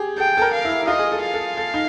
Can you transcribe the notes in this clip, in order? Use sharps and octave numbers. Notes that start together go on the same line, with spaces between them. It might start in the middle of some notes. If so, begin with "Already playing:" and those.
Already playing: G4 G#4
A4 G5
A4
A#4
F5
E4
E4
F4 D#5
G#4
A4
F5
A4
A4
D#4